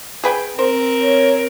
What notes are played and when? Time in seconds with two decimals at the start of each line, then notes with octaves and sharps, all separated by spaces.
0.24 G#4 B4 G5
0.59 C4 A#4 C5
1.01 C#5